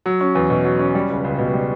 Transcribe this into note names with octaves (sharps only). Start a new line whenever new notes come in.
F#3
C#4
E2
B2
F#3
C#4
G3
C#2
C#2
B2
G3